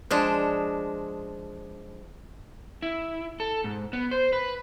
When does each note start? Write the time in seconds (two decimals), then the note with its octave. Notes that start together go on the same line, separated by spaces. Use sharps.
0.10 F3 G#3 D4
2.82 E4
3.40 A4
3.64 G#2
3.93 B3
4.11 C5
4.33 B4